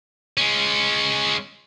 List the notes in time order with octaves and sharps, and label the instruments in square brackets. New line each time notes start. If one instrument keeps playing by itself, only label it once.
[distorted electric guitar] G#3 C#4